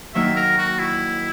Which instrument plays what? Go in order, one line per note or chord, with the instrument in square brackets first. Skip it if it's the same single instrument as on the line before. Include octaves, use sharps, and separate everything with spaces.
[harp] D#3 F#3 A#3 D#4 [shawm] E5
[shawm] A#4
F#4
E4